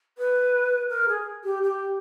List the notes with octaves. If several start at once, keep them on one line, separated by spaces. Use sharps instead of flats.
B4
A#4
G#4
G4
G4